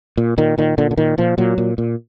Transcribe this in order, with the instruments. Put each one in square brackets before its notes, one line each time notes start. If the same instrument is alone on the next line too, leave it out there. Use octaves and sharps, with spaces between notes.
[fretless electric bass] A#2
A#2 D#3
A#2 D#3
A#2 D3
D3
A#2 D#3
A#2 F3
A#2 F#3
A#2
A#2